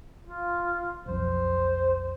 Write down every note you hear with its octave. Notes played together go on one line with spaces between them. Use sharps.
F4
B1 F2 C5